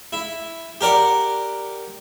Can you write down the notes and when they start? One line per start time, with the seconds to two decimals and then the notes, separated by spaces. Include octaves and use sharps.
0.13 E4
0.81 G4 A#4 D5 F#5